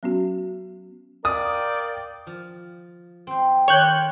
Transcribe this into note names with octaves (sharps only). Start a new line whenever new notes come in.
F#3 B3 C#4 F#4
A#4 D5 F5 G5 D#6
F3
C4 C5
D#3 C#5 D5 F#6 G6